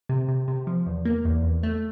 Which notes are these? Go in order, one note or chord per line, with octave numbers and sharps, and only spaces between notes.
C3
C3
C3
F3
E2
A#3
E2
E2
A3